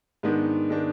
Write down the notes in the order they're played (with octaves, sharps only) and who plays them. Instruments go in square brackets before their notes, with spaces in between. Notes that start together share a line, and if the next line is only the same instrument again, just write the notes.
[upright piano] G#2 D#3 G#3 B3 D4
D#3 G#3 B3 D4